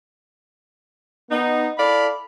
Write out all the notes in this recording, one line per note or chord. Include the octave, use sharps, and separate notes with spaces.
B3 D#4
E4 A4 D5 F5 B5